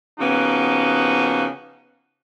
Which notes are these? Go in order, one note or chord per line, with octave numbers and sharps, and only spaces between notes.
C#3 F3 A#3 B3 D#4 F#4